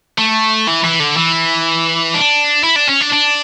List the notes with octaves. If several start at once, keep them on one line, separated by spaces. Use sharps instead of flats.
A3
E3
E3
D3
E3
D4
E4
D4
C#4
D4
D4